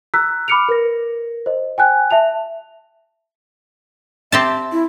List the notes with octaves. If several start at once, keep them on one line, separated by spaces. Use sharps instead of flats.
A#5 E6 F#6 B6
B5 D6 F6 C#7 D7 F7
A#4 B4 A#6
C5 D#5
G5 G#5 F#6
E5 A5 F7
C4 G4 E5 A5
E4